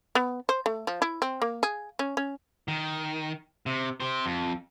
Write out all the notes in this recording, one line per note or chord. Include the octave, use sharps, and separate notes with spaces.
B3
C5
A3
F3
E4
C4
A#3
G#4
C#4
C#4
D#3
C3
G4 C5
F2